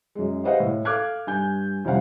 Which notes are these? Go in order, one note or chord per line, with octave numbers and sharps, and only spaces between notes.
F#2 G#3
G4 B4 C5 D#5 F5 F#5
A2
A4 F5 D6 F6 F#6 G#6
G2 G#5 G6
C2 F2 C#3 E4 F5 F#5